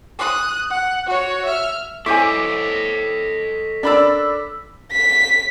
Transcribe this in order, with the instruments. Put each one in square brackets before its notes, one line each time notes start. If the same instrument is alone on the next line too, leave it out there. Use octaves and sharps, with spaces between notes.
[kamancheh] D#6 F#6
F#5
F#4 C#5
E5 F6
[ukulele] E4 C5 G#5 [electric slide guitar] A4 C#5 D#5 [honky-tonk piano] D6 [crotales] B6
[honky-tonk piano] D4 B5 E6 [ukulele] A#4 D5
[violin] B6